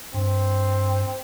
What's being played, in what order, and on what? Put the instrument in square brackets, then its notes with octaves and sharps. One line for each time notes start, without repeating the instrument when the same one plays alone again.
[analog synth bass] G2 [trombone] C4